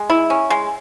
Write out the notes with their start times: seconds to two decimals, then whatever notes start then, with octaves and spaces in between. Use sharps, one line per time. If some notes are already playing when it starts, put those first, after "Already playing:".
Already playing: G#3
0.10 E4
0.30 C#4
0.50 G#3